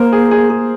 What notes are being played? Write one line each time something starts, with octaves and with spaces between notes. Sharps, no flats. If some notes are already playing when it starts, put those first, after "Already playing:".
Already playing: A#3 A#4 C5
G#4
G#4
G#4